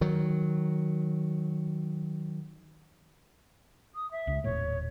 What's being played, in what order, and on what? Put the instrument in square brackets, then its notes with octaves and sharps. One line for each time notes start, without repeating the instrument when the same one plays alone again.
[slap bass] D#3 F#3
[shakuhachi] D#6
E5
[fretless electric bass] C#2
[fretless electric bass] D#1 A2 [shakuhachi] C#5